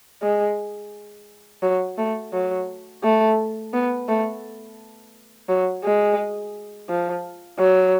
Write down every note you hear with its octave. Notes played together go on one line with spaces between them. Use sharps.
G#3
F#3
A3
F#3
A3
B3
A3
F#3
G#3
F3
F#3